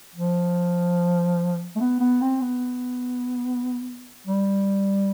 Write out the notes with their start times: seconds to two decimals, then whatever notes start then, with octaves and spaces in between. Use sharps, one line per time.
0.15 F3
1.76 A3
1.80 B3
2.00 B3
2.21 C4
2.41 B3
4.27 G3